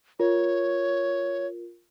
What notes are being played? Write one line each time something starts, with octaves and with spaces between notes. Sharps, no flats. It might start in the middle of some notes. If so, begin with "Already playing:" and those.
F4 A#4 C#5